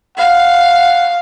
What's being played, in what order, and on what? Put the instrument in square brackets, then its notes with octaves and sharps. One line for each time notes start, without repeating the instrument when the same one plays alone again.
[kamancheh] F5 [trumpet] F#5